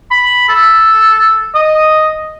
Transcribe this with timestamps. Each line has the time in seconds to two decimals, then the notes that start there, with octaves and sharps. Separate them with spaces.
0.11 B5
0.49 A4
1.55 D#5